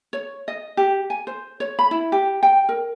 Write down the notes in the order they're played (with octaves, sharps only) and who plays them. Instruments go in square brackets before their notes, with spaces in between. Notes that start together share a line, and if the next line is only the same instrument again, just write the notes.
[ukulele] C#5
D#5
G4
G#5
C5
C#5
B5
E4
G4
G5
A#4